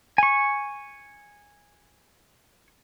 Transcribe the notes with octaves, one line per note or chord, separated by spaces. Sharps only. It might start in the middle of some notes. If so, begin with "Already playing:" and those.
G#5 C#6